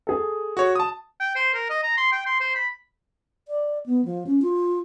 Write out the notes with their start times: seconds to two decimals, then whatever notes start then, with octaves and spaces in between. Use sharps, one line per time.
0.07 G#4 A4
0.57 F#4 C#5
0.75 A5 D#6
1.20 G5
1.36 C5
1.54 A#4
1.70 D#5
1.83 A#5
1.97 C6
2.12 G5
2.26 C6
2.40 C5
2.55 B5
3.47 D5
3.86 B3
4.05 F3
4.27 C#4
4.42 F4